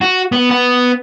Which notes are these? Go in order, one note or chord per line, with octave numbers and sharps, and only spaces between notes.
F#4
B3
B3